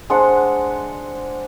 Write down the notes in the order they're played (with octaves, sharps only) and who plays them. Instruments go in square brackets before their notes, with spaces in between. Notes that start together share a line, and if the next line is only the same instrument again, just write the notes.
[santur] G#3 D4 C5 F#5